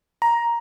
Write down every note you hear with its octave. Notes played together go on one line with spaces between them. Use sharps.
A#5